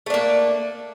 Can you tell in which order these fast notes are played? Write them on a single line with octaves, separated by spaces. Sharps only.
A3 D4 A#3